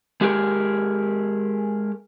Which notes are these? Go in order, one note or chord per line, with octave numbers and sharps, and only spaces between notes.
G#3 G4 G#4 A#4